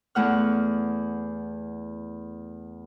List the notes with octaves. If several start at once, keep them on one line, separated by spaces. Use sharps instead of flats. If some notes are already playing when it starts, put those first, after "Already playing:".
E2 A3 F#5 F6